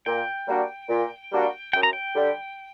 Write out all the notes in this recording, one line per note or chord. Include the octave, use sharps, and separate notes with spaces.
A#2 G5
G3 A#3 D4 F#4
A#2
G3 A#3 D4 F#4
F#2 G5
A#5
G5
D3 G3